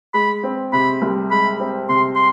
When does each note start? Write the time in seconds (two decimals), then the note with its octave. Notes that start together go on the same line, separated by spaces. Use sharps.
0.14 G#3 B5
0.43 C4
0.72 C3 B5
1.02 C2
1.31 G#3 B5
1.60 C4
1.89 C3 C6
2.15 C6